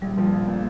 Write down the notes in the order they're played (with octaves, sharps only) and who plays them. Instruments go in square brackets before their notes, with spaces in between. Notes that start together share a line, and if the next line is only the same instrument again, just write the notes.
[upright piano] A#1 [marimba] G3
[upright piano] F3
A#1
A#2